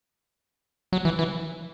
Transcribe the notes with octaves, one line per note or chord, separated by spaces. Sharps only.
F#3
E3
E3